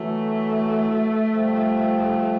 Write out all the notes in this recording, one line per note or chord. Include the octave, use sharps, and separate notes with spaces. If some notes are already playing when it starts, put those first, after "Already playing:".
Already playing: E3 F#3 A3
F3 G3